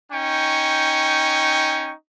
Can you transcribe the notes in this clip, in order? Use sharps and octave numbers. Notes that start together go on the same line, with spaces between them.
C#4 D#4 G5 C#6